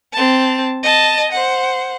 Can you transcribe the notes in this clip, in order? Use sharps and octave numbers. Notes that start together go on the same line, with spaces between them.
C4 A5
D#5 A5
C5 F#5